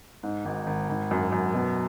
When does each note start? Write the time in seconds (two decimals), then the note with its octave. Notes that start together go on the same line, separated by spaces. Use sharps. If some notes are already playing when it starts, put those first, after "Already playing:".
0.23 G#2
0.45 G#1
0.67 G#1
0.89 G#1
1.11 F#2
1.32 F#2
1.54 B2